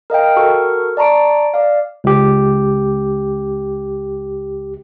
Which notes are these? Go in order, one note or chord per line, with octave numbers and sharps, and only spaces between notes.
A#4 D#5 F5 G5
F#4 A4 A#4 C#6
D5 A5 A#5 C#6 D7
D5 F5
C#2 G4